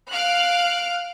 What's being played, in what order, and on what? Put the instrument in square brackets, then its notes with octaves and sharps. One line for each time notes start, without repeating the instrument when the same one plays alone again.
[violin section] F5 F6 F#6 D7